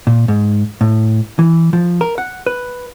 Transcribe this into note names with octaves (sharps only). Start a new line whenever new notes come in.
A#2
G#2
A2
E3
F3
A#4
F#5
B4